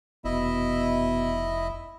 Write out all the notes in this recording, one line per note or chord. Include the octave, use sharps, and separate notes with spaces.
F1 B2 E4 D#5 E5